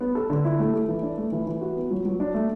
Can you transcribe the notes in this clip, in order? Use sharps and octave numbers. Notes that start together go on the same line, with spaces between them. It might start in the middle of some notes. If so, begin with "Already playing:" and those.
B3
A4
D3
E4
A3
A4
E3
D4
A3
E3
E3
F#4
B3
F#3
F#3
D4
A3